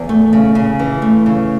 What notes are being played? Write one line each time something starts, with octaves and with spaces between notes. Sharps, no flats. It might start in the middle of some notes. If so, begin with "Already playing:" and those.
Already playing: E2
A3
C#3
C#3
E3
A3
C#3